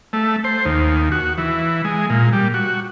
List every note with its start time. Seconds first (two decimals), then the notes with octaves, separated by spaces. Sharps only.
0.13 A3
0.44 C5
0.65 D#2
1.12 F#4
1.38 E3
1.85 G#3
2.10 A#2
2.33 G3
2.54 F#4